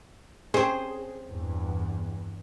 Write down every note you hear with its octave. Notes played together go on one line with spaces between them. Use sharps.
C4 C#4 G#4 C5
E2 G2